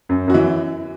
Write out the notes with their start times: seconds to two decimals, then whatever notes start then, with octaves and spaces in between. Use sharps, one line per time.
0.09 F#2
0.28 F#2 F#4
0.34 E3 E4